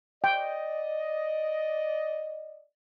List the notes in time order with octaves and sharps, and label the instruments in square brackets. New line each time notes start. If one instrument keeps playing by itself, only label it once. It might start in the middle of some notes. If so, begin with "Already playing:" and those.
[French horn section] D5 D#5 [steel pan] G5